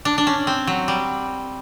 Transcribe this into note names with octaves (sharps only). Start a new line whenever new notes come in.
D4
D4
C#4
C4
F#3
G3